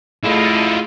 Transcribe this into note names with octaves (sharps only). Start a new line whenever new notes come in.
D3 A3 E4 F4 G#4 D#5